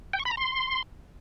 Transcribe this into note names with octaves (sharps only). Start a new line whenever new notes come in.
G5
C#6
B5
A#5
C6